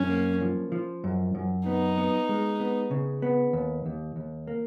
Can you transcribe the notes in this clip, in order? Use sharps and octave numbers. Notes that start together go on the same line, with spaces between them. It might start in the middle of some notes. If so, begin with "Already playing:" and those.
Already playing: F#2 C#4
A#3
F3
F3
F#2
F#2
B3 D#4
B3
G#3
B3
C#3
B3
D#2
D#2
D#2
A#3